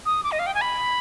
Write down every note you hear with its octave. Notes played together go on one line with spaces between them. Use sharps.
D#6
D6
D#5
F5
G5
G#5
B5